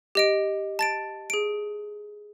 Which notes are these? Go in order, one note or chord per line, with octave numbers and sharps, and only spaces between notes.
G4 D#5 D7
A5 A6 D7
G#4 D7